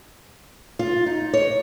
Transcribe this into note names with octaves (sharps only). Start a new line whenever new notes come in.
F4
D#4
C#5